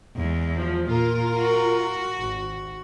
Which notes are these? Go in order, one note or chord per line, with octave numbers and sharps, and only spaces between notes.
E2 G#3
F3
A#2 F4 A#4
F#4
G#1